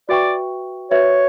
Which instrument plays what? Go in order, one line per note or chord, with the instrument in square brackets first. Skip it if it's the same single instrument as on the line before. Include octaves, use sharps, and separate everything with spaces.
[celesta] F#4 B4 E5 G5 C#6 [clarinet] D5
[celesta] F#4 B4 E5 [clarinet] C#5